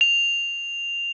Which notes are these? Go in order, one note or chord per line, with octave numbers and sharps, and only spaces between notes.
F7